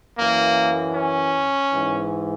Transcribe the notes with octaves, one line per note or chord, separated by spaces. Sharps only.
F#2 E3 A#3
C#4
G#2 E3